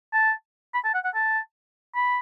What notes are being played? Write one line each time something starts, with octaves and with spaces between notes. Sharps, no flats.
A5
B5
A5
F#5
F#5
A5
B5